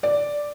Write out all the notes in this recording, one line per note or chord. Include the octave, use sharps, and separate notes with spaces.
D5